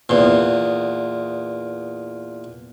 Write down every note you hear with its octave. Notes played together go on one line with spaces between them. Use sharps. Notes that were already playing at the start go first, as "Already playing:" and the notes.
E2 A#2